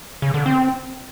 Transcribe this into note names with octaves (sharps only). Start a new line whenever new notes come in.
C#3
D3
C4